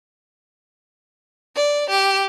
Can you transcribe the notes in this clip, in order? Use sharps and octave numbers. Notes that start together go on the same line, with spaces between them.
D5
G4